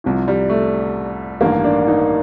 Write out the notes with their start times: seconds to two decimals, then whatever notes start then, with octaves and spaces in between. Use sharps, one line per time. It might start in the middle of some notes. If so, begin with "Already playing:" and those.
0.04 C2 C3 F3
0.28 G3
0.50 A3
1.41 A1 G2 D#3 A#3
1.64 D4
1.87 D#4